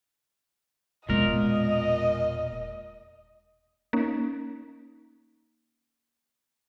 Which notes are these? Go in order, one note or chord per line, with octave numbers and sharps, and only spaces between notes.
E1 A#2 G#3 A#4 D#5
A#3 C#4 D#4